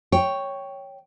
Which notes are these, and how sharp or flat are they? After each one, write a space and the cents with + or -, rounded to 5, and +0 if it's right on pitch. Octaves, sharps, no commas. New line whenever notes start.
C#5 +0 G5 +0